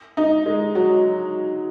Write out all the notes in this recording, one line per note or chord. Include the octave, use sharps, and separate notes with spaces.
D#4
G#3
F#3